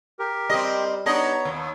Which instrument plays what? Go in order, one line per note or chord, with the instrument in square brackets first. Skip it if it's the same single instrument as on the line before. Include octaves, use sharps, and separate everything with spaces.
[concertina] G4 A#4
[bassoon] G3 [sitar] C4 D#5
[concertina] B3 C#5 A#5 [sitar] D4 D#4 D#5
[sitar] D#2